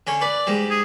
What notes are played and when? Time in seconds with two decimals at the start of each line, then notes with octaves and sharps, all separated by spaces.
0.07 D3 C#4
0.21 B4 D5
0.47 G#2 G3
0.70 G#4